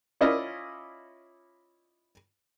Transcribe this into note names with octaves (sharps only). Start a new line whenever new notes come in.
C#4 E4 F4 D5 D#5 F5